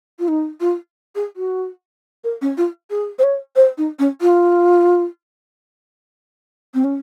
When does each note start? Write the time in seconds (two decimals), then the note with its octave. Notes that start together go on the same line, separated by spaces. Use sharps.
0.19 F4
0.28 D#4
0.61 F4
1.15 G#4
1.36 F#4
2.24 A#4
2.42 C#4
2.57 F4
2.90 G#4
3.19 C5
3.23 C#5
3.56 C5
3.78 D#4
3.99 C#4
4.21 F4
6.74 C4
6.84 C#4